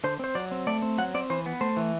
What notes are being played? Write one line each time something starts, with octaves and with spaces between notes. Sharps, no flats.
D3 C5
C4 C5
F#3 D5
C4
A3 D5
C4
F#3 F#5
C4 D5
E3 C5
B3
A3 C5
E3